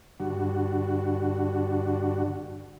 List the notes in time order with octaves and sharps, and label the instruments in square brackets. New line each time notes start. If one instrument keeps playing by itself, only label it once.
[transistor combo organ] G2 D3 F#4